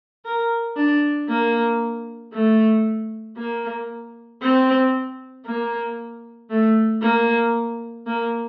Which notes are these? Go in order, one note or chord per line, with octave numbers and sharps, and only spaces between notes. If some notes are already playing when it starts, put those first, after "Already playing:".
A#4
D4
A#3
A3
A#3
C4
A#3
A3
A#3
A#3